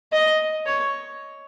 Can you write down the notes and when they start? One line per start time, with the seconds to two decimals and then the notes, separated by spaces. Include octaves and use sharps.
0.12 D#5
0.66 C#5